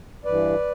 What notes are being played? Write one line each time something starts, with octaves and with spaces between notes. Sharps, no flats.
G2 E3 B4 D5